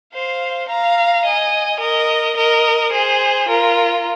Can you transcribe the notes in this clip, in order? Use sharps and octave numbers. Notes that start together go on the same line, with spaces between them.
C5 F5
F5 A#5
D#5 G#5
A#4 D#5
A#4 D#5
G#4 C5
F4 A#4